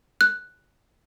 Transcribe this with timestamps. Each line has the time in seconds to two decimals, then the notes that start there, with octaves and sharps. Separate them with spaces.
0.21 F#6